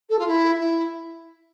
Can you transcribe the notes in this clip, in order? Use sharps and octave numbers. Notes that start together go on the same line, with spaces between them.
A4
F4
E4
E4